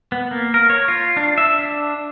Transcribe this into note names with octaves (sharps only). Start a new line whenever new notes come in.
B3
A#3
A#4
C#5
F4
D4
E5
D4